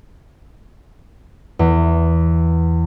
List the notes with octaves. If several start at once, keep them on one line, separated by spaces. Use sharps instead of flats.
E2